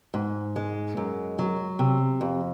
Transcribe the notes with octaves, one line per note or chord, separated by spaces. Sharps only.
G#2
G#3
F#2
F#3
C3
F2